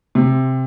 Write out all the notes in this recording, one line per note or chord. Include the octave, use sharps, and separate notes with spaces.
C3